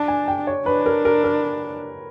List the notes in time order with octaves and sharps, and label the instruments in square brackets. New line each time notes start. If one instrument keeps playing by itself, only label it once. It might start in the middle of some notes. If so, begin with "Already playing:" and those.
Already playing: [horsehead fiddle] D4 [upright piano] A5
[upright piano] G#5
G5
C#5
[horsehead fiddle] D4 [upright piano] B4
[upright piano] A#4
A#4
A#4